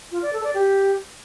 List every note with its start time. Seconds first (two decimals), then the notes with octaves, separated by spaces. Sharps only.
0.12 F4
0.22 D5
0.33 A4
0.44 D5
0.54 G4